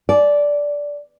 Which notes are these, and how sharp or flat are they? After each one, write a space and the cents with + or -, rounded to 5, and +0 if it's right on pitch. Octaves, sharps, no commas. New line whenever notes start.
D5 -10 G#5 +40